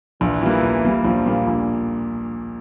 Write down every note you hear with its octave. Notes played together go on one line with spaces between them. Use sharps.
A#1 E3
A#2 G3 A#3
A#1
A#2 G3 A#3
A#1 F3
A#2 G3 A#3
A#1